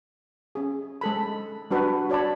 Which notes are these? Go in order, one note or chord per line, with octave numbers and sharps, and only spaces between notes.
C#4 G#4
G#3 A4 B5
G3 D4 F#4 B4
F#4 C#5 D5 A5 B5